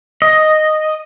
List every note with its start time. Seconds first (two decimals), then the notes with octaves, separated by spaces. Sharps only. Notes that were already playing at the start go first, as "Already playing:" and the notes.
0.22 D#5